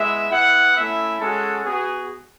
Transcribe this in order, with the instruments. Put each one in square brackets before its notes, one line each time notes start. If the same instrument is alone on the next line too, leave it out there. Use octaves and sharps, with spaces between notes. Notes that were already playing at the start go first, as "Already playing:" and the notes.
Already playing: [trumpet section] G#3 B3 E4 E5
B3 E4 F#5
A3 C#4 E4 E5
G#3 C#4 F#4 A4
B3 F#4 G#4